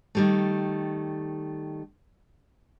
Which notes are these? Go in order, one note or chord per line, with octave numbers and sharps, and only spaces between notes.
D#3 G3 A3